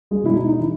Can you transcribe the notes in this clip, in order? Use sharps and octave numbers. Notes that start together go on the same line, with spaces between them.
G#3 G#4
B2 G#3 E4
D#4
D#4
E3 E4